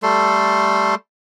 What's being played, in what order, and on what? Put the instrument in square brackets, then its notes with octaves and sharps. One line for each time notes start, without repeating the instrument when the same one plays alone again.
[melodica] G3 A3 A4 C6